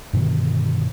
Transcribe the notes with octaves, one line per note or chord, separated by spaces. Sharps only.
G2 B2 D3 D#3